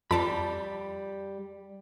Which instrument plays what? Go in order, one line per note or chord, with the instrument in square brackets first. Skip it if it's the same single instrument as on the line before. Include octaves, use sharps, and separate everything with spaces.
[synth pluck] F2 A5 [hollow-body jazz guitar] G3 D5 B5